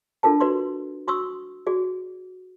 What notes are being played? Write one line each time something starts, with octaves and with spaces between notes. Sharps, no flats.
D4 F4 A4 A#4 A5
F#4 B4 D5 C6
F#4 C6 C#6 D#6 E6
F#4 G#4 D5